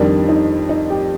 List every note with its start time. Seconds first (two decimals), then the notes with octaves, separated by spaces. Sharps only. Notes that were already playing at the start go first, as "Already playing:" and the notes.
Already playing: F2 D#3 G3 D4
0.29 D#4
0.69 D#4
0.90 G4